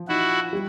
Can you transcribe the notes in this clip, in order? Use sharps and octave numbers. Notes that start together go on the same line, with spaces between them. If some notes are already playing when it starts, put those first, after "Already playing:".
Already playing: F3
D#4 E4 F#4
G3